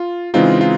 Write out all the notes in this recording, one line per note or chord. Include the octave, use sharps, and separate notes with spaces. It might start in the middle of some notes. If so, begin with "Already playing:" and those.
Already playing: F4
C#3 E3 G#3 C4 D#4 F4
F4